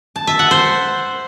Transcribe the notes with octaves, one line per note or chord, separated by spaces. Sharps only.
A5
E5
F#5
C5